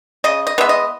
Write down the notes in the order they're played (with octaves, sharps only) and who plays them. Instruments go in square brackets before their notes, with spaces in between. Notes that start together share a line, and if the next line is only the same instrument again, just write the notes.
[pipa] C#3 D#5
D#5
E3 G#3 B3 E5
D#5